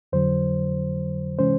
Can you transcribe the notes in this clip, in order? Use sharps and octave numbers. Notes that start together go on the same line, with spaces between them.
F2 D3 F#3 C5
C3 E3 G#3 C#4 C5